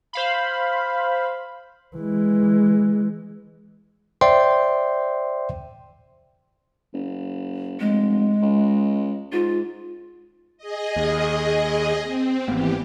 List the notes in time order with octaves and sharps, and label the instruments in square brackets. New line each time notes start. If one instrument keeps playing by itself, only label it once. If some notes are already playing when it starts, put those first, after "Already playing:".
[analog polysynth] C5 F5 B5
[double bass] E3 G#3
[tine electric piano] C5 D5 E5 G5 C6
[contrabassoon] F#1
[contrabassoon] F1 [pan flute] G#3
[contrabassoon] C#2
[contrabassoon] G#2 [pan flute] F4
[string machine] G#4 D#5
[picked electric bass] D#2
[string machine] C4
[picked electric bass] G#1 A#3 B3 [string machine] E3 G4